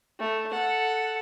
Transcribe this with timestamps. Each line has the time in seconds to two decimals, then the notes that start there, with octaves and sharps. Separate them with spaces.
0.20 A3
0.50 A4 F#5